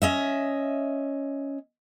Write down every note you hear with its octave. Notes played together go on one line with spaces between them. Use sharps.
C#4 D#5 E5